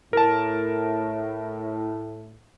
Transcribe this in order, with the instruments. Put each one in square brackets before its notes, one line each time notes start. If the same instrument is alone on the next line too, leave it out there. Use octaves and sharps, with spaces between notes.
[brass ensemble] A2 [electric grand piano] A#4 A5